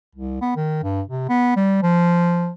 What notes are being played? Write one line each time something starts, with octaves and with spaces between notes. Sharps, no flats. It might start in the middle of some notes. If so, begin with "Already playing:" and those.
C2
B3
D#3
G2
C3
B3
G3
F3